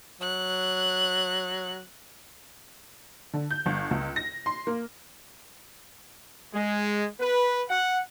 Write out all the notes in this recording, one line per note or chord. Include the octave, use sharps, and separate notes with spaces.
F#3 F#6
D3
G6
G1
C#2
A#6
C6
A#3
G#3
B4
F#5